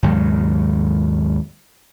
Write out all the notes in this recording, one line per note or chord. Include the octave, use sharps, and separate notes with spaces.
D#2 G#2 C#3 F#3